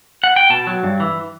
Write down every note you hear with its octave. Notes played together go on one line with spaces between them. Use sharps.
F#5
G5
B2 A5
F#3
G2
E3